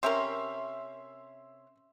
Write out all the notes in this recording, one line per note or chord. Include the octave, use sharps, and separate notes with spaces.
C3 C#4 A#4 E5 C6